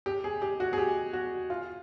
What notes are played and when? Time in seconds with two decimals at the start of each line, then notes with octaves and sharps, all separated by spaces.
0.06 G4
0.24 G#4
0.42 G4
0.60 F#4
0.73 G#4
0.78 G4
1.13 F#4
1.50 F4